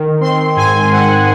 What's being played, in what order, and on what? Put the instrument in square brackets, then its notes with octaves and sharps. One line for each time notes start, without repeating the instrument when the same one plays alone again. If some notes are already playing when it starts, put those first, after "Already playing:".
Already playing: [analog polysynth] D#3
C4 C6
G#2 G#5
G#2 F#5